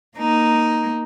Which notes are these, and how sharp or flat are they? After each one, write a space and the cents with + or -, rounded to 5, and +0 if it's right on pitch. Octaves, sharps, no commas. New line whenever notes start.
A#3 +5 D#4 +0